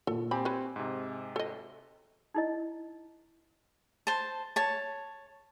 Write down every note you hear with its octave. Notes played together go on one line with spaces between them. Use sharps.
A#2 A4
C4 G4 G#5 B5
B4 C#5
G#2 C3
A4 D#5
D#4 E4 D#5
C5 A5
C#5 A5